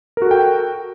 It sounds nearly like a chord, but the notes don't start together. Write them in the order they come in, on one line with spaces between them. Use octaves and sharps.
A#4 F#4 A4 G5